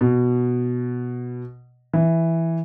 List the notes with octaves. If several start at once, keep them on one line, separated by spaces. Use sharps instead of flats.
B2
E3